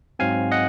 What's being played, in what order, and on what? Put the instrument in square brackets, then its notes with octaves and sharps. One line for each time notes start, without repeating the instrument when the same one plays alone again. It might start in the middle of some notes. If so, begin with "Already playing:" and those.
[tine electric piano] G#2 F#3 C4 F5 G#5
D#5 F#5